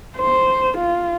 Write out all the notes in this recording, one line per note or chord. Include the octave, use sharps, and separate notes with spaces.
C5
F4